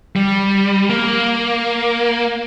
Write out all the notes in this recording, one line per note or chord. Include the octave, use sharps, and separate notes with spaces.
G3
A#3